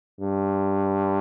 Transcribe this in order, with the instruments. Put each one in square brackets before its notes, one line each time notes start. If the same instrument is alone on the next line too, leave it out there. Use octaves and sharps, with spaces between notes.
[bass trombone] G2